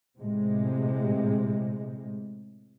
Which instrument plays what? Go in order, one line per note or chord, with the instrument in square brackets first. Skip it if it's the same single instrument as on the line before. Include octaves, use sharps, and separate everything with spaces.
[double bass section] A2 C3 G#3